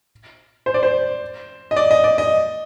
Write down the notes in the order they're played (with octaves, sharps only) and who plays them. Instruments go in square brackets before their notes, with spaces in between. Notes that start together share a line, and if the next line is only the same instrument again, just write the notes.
[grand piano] C5
D5
C5
D#5
D5
D#5
D5
D#5